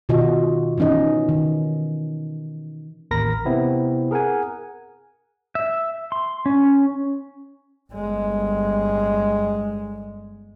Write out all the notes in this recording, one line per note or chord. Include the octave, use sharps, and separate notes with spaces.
B2 D#3 F4 F#4 D#5
E3 B3 C#4 D#4 D#5
D#3
A1 D#2 A#4 A#5 B5 A#6
C3 B3 C4 E4
G#4 A#4 F#5 G#5
E5
C6
C#4
G1 G#3